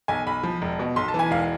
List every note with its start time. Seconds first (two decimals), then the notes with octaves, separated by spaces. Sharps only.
0.08 B1 G#5
0.27 B1 B5
0.43 F3
0.62 E1
0.79 B2
0.96 B1 C6
1.08 A5
1.14 E3
1.19 G#5
1.31 E1 F5